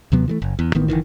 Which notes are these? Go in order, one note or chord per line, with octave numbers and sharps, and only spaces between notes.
D#2 C3 F#3 B3
E3 G#3 A3
F#1
E2
A1 D#3 E3 B3
F#1 B1 D#3 E3